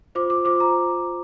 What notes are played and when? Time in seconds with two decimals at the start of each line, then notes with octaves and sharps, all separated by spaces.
0.15 F4 C5 D6
0.30 D6
0.45 F4 C5 D6
0.60 A#5